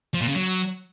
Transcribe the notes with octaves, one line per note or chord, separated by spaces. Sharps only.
F3
A#2
C#3
F#3